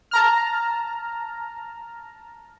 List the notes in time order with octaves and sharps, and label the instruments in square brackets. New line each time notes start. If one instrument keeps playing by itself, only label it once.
[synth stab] A5 A#5 F6